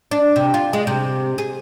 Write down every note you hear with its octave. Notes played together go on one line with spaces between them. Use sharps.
D4
C3
F4
G#3
C3
G#4